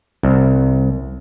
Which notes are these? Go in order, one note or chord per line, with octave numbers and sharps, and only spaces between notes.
C2